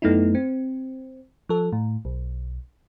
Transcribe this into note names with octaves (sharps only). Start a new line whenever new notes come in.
F#2 A3 B3 D#4 E4
C4
F3 A4
A2
B1